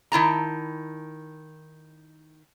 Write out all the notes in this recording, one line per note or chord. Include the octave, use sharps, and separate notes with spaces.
D#3 E4 A5 A#5